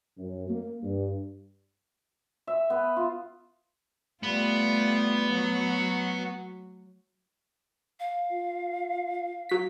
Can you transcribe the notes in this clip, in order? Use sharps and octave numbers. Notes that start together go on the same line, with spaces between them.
F#2
A#3
G2
E5
B3
F4
G3 A3 B3 F4
F#3 F#4
F5
F4
F#3 B6